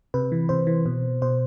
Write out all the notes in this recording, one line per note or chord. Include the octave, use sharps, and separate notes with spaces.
C3 B4
E3
C3 C5
E3
B2
B2 C5